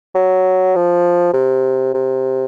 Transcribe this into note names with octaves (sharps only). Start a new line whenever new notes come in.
F#3
F3
C3
C3